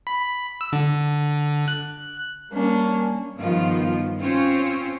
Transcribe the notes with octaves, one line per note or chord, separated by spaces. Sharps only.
B5
E6
D3
F#6
G3 A#3 C#4 D4
G2 D#3 F3 B3 F4
C4 C#4 F4 C5 C#5